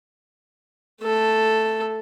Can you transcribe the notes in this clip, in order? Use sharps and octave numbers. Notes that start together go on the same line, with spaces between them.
A3 A4